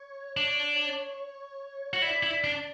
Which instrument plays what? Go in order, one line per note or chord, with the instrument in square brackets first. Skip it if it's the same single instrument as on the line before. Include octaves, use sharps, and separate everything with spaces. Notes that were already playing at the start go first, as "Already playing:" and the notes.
Already playing: [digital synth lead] C#5
[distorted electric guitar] D4 [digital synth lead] C#5
[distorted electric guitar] F#4
[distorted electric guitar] E4 [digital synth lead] D5
[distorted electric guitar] E4
D4